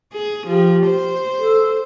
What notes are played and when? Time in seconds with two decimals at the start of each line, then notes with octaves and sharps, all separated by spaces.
0.13 G#4
0.48 F3 G4
0.87 C5
1.39 A4